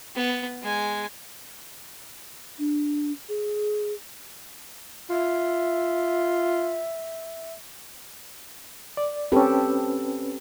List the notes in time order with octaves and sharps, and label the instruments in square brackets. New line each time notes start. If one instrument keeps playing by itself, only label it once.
[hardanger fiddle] B3
G#3 G#5
[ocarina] D4
G#4
[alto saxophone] F4 [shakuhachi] E5
[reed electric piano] D5
[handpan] C4 G4 A4 [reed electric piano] C#4 B4